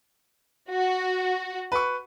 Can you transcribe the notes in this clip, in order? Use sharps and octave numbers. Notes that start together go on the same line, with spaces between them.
F#4
B4 C#6